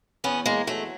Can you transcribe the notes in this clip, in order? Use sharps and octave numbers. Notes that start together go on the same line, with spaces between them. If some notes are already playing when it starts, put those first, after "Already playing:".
E2 B3 C#4
G#3 A#3
F#3 A3